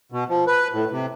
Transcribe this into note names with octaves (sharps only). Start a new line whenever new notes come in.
B2
F3
B4
A2
C3